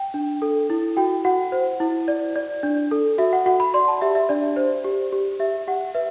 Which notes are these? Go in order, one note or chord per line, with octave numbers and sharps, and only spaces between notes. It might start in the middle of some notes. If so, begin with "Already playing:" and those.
Already playing: G5
D4
A4
E4
F#4 G5
F#4 F#5
C5
E4
D5
D5
D4
A4
F#4 E5
F#5
F#4 F#5
B5
D5 C6
A5
G4 E5
E5
D4 D5
C5
G4
G4
G4 E5
G4 F#5
B4 E5